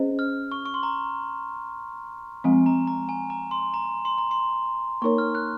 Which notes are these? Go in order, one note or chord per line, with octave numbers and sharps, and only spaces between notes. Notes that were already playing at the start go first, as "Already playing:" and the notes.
Already playing: C#4 G#4 C5 D#5
F6
C#6
C#6
C6
A#5
F3 G#3 C4 G#5
A#5
A#5
G#5
A#5
C6
A#5
C6
A#5
C6
A#3 D#4 A#4 C#5 C#6
F6
F#6